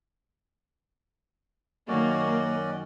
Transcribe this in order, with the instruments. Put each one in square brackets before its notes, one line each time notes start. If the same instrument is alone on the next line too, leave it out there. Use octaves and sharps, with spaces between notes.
[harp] F#2 D#3 [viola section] A#3 [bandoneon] C#4 F#4 D5 [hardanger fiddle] D#5